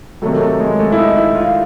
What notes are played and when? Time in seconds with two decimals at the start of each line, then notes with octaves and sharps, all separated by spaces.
0.22 C3 D#3 F#3 A3
0.41 A3
0.60 G#3
0.79 A3
0.92 E4
0.98 D#4
1.16 E4
1.35 F4